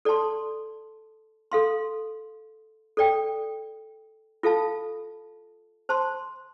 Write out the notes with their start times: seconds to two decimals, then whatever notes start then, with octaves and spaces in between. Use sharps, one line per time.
0.05 A4 D5 A5 C6
1.52 A4 F5 C6
2.97 A4 D5 G5
4.43 F4 A4 F5 A5
5.89 C5 A5 C6